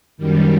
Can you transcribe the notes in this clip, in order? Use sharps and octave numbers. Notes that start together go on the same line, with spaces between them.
F#2 D#3 G3